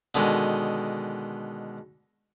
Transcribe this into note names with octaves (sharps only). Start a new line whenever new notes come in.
B2 D3 D#3 G#3